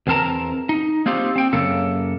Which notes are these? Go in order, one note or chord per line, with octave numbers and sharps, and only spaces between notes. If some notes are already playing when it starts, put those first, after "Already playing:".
E2 E3 C4 A#4 A5 A#5
D#4
A#3 C4 D#4 F4 G4
C4 G5
F#2 C#3 A#3 A4